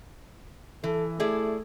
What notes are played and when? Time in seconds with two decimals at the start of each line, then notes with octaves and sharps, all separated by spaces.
0.84 E3 A4
1.20 A3 E4 G#4 D5